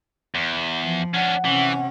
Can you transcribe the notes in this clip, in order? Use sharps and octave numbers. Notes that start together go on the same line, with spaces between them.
E2
F3
C#4 D4 F#5
C3 E3 C#4